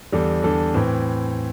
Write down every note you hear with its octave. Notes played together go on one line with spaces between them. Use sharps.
E2 D3 G3 D4 A4
E2 D3 G3 D4 A4
A2 E3 C4